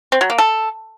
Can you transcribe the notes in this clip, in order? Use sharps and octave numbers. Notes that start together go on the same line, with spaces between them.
C4
F#3
A#3
A4